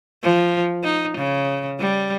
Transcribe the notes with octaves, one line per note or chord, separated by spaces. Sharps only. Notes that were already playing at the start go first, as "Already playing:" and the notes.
F3
D#4
C#3
G3